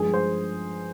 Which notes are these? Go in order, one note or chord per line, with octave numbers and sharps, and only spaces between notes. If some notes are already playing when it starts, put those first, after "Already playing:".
Already playing: G2 F3 G#3 G#4
C5